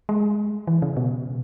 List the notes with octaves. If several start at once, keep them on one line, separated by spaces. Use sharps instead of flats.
G#3
E3
C#3
B2